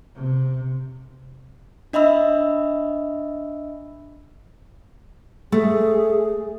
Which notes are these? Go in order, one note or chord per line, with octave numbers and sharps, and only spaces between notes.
C3
D4 D#5 E5 B5 E6
A3 G#4